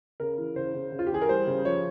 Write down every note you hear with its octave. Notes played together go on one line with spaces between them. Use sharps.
C#3 A#4
E3
C#3 C5
C#3
C#3
F4
G4
E3 G#4
A#4
G3 C5
C#3
F3 C#5